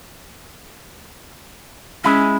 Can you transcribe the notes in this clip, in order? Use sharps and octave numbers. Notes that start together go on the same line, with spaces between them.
G#3 C#4 E4